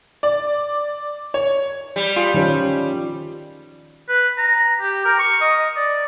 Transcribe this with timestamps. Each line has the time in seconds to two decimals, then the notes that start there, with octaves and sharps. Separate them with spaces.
0.23 D5
1.34 C#5
1.96 G3
2.16 F4 G#4
2.34 D#3 F3 C#4
4.08 B4
4.38 A#5
4.81 G4
5.05 A#4
5.19 C#6
5.41 D#5
5.76 D5